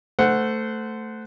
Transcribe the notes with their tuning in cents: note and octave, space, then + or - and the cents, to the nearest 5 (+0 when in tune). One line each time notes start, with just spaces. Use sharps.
A3 +5 C5 -20 F#5 +0